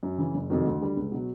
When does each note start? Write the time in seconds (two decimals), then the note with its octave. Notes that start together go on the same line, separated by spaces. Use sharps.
0.03 F#2
0.18 C#3 E3
0.34 F#1
0.50 F2 C3 D#3 F#3
0.66 D2
0.81 D3 G3
0.97 C#2
1.12 B2 F#3